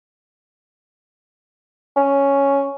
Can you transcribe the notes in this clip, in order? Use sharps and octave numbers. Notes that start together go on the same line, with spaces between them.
C#4